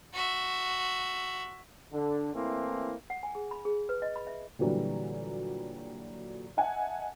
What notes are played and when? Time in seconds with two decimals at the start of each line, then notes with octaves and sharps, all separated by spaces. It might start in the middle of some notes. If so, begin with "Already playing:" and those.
0.14 F#4 E5
1.92 D3
2.34 E3 A3 A#3 C4 E4
3.10 F#5
3.23 G#5
3.35 G#4
3.51 B5
3.65 G#4
3.89 B4
4.02 D#5
4.16 B5
4.27 E5
4.59 A#2 D3 E3 F#3 G3
6.57 D#5 E5 F#5 G#5 A5